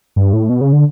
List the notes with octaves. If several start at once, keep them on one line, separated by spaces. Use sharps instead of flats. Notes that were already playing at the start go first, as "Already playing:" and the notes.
G2
A2
B2
C#3
D3